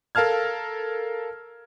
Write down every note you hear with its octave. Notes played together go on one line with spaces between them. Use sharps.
A4 A#4 F5 A5 F6 G#6